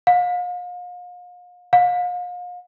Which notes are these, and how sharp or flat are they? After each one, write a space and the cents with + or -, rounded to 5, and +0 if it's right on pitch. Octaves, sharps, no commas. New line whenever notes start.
F5 +40
F5 +40